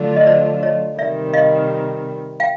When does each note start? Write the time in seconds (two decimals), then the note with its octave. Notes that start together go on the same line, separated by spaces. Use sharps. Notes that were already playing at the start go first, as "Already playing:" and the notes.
Already playing: D3 F#3 A3 D4 F4
0.17 D#5
0.27 C5 D5
0.63 C#5 D#5
0.98 C3 D#3 G3 D5 E5
1.34 D#5 F5
2.40 F5 G5